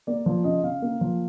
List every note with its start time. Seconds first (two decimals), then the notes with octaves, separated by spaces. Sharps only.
0.07 A#3 D5
0.26 F3
0.44 C#3 D#5
0.64 C#3 F5
0.82 A#3
1.01 F3